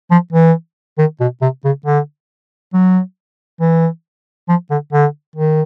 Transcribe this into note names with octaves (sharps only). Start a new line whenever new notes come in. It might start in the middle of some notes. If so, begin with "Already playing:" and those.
F3
E3
D#3
B2
C3
C#3
D3
F#3
E3
F3
D3
D3
D#3